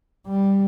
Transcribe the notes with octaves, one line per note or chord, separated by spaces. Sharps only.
G3